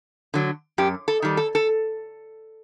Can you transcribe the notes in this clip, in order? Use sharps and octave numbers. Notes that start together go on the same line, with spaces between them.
D3 F#3
F#2 G4
A4
D#3 G3
A4
A4